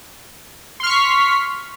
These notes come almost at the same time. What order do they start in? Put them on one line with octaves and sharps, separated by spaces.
C6 F6 C#6 B6